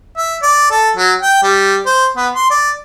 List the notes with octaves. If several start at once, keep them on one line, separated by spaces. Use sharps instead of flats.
E5
D5
A4
F#3
G5
G3
C5
B3
C6
D5